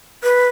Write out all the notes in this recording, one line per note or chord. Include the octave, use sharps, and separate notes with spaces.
B4